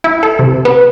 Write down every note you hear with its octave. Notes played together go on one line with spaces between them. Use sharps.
E4
A4
C3
B3